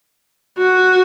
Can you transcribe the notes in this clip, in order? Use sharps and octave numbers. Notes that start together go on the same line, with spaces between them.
F#4